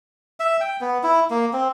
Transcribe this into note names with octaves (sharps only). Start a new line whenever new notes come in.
E5
G5
B3
E4
A#3
C4